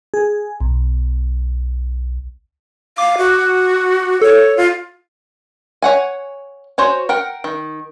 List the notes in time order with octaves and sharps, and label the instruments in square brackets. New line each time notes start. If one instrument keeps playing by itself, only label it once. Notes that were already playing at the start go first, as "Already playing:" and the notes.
[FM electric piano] G#4
B1
[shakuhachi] F5 [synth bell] D6
[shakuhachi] F#4
[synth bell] A4 [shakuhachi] C#5
[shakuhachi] F4
[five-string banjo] C#5 F#5 G#5
F#4 C5 C#5 G#5
A#4 F#5 G5
D#3